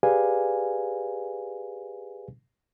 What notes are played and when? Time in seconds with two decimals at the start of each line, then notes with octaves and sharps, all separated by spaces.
0.03 G4 G#4 B4 D5 F5 G#5